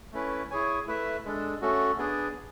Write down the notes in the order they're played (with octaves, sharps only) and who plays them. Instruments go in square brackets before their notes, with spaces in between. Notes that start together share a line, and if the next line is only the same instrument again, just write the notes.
[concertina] A3 C#4 E4 B4
E4 G#4 C#5 G#5
A3 E4 B4 E5
G#3 D4 A4
A3 C#4 F#4 A4
B3 D4 G#4 D5